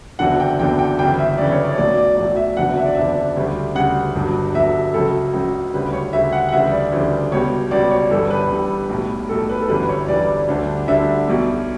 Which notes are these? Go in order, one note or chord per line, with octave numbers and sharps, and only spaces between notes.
F#1 E2 D3 F#3 F#5
G5
F#1 E2 D3 F#3 G5
G5
G1 F#2 C#3 E3 G5
E5
G1 F#2 C#3 E3 D5
C#5
D5
C#5
B1 A2 F#3 D5
D5
B1 A2 F#3 D5
E5
F#1 E2 D3 F#3 F#5
E5
D5
F#1 E2 D3 F#3 E5
D2 C#3 G3
D2 C#3 G3 F#5
G1 G2 F#3
G1 G2 F#3 E5
C#2 C#3 F#3 A4
C#2 C#3 F#3
D2 C#3 G3 B4
C#5
D2 C#3 G3 E5
F#5
F#5
D2 C#3 E3 G3 E5
D5
D2 C#3 E3 G3
C#2 B2 G3 C#5
C#2 B2 G3 D5
C#5
G1 G2 E3 G3 A4
B4
G1 G2 E3 G3
B1 A2 G3
B1 A2 G3 A4
B4
A4
G1 F#2 E3 G3 B4
C#5
G1 F#2 E3 G3 D5
D2 D3 G3
D2 D3 G3 E5
B1 B2 G3